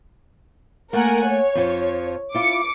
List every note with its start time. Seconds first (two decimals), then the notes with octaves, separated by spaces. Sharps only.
0.93 A3 A#3 A#4 F#5 G#5
1.27 C#5
1.55 F2 F3
2.34 E4 F4 D6 C#7